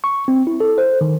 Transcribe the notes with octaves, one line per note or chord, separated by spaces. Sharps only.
C#6
C4
E4
A4
C5
D#3